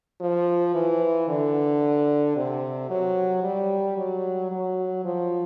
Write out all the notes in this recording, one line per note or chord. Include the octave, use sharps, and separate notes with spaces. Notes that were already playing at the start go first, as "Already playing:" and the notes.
F3
E3
D3
C3
F#3
G3
F#3
F#3
F3